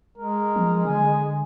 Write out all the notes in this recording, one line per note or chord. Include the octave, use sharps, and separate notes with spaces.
G#3 A#4
F3
D3 G#5